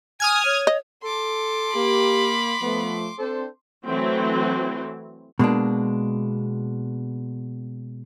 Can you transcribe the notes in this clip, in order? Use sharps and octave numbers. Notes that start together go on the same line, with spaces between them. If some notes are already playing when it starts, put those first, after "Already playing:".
G#5 D#6 F6 G#6
C#5
D#5
A4 C6 D6
A#3 G4 B5
F3 A3 B3
C4 D4 A4 C5
E3 F#3 A3 C4
B2 G#3 A#3 D4